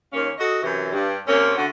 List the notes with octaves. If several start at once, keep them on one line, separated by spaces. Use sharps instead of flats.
D#2 A#3 C#4 C#5 F5
F#4 A4 D#5
F#2 C3 E3
G2
C3 A#3 C4 C#4
D3 A3 F#4